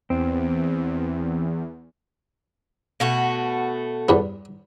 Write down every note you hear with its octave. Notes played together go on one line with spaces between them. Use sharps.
E2 C4
B2 A3 F#4
E2 G2 B3